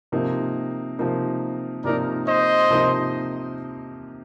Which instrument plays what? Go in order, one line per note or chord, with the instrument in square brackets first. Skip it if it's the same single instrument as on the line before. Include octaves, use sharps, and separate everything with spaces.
[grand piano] C3 F3 A#3 D#4
C3 F3 A#3 D#4
[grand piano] C3 F3 A#3 D#4 [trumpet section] A#4 D5
[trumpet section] C5 D#5
[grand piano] C3 F3 A#3 D#4